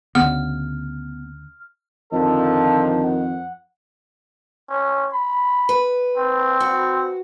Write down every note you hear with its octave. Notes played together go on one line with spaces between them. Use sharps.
D2 C#3 B3 F#5 F6
F2 D3 D#3 F3 A4
F#5
C#4
B5
B4
C4
F#4